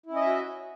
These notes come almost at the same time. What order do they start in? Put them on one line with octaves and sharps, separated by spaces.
E4 C#4 D#5 E5 F#4